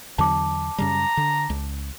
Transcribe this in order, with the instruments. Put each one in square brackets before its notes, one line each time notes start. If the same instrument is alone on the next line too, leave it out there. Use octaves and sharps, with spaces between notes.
[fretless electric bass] E2 D3 F#3 [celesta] A5 D6
[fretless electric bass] F#2 C#3 G3 [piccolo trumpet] A#5
[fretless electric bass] D3
C#2